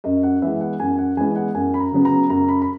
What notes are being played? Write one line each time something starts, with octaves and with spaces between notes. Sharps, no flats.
F#2 D#5
F#5
E3 G#3 B3 E5
F#5
F#2 G#5
F#5
E3 G#3 B3 G#5
F#5
F#2 G#5
B5
A#5
C#3 F#3 B3
A#5
F#2 A#5
B5
B5